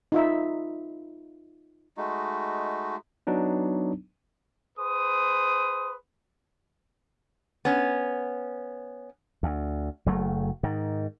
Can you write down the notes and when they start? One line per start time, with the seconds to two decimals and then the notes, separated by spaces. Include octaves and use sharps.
0.12 D#4 F4 E5
1.97 G#3 A3 D#4 F#4
3.27 F#3 B3 D4 D#4
4.78 G#4 B4 C5 D#6
7.65 B3 C#4
9.43 D2
10.06 F#1 F#3 A3
10.63 G#2 D#3